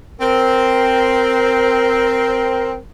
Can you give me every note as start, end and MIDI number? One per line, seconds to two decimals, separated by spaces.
0.20 2.75 60
0.20 2.78 70